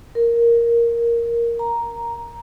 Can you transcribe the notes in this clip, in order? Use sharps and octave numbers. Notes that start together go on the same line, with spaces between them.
A#4
A#5